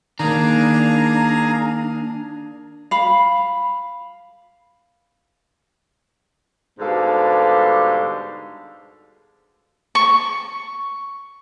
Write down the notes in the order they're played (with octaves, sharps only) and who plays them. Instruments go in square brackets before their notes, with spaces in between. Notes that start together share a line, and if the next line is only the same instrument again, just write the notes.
[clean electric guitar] D#3 A#3 [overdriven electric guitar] D4 [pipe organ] G#4 F5 D#6 [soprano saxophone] A#5
[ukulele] F5 B5
[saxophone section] G#2 B2 D3 G3 A4 F5
[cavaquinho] C#6